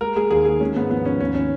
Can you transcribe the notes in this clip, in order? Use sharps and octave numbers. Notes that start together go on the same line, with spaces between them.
G#3 A#4
G#3 G#4
D#2 G#4
D#3 G#4
G#3 C#4
G#2 B3
F3 B3
G#2 C#4
D#2 C#4
C#4